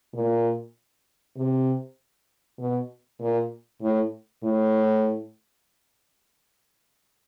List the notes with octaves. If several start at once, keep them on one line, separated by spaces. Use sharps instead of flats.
A#2
C3
B2
A#2
A2
A2